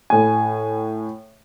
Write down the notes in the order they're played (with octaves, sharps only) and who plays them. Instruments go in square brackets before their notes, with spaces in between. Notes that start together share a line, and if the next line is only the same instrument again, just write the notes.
[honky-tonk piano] A2 G#5